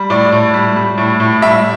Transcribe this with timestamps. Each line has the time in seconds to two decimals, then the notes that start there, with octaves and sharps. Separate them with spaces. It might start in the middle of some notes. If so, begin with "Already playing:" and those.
Already playing: G3
0.10 A2 D5
0.32 A2
0.54 G3
0.76 G3
0.98 A2
1.20 A2
1.42 G3 E5